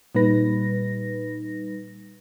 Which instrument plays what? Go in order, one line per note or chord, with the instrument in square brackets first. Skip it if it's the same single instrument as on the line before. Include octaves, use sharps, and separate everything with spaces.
[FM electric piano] A#2 G3 D#4 B4 A#6